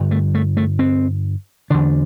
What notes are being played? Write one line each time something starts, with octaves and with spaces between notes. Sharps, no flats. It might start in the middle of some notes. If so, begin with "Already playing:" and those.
Already playing: G2 D3
A3
A3
A3
C4
E2 D3 D4